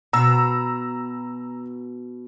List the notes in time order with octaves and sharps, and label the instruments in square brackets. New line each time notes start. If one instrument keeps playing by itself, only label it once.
[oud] B2 [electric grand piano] A#5 E6